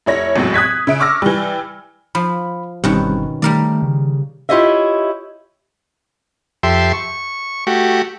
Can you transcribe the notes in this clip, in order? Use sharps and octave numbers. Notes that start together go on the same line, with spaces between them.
F1 E4 C#5 A#6
G#1 E2 A2 C3 F#3
D#6 F#6 G#6 B6
C#3 E5 D7
C#6 D6 E6 F6 A#6
E3 G3
F3 B5
G1 B2 D#3 G3 C4 C#4 F#6
D#3 G3 A3 A#4 D5
C#3
E4 F4 G4 C#5 D#5 E5
F2 G4 A4 E5 C6
C#6
A3 F#4 G4